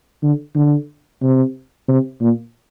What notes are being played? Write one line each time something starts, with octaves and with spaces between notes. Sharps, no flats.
D3
D3
C3
C3
A#2